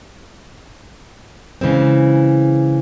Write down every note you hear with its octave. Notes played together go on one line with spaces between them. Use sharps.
C#3 E3 G#3 C4